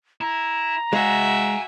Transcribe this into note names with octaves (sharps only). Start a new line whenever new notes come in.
E4 A#5
G#3 F#4 E5 F5 G#5